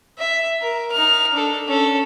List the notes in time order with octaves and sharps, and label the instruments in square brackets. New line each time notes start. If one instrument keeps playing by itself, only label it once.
[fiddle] E5
A#4
D#4 F6
D4 A4
C#4 A4